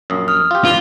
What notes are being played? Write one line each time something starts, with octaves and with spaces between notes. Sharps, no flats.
A#1 F#2 D#6
D#6 F6
F4 G4 F5
E2 G2 F4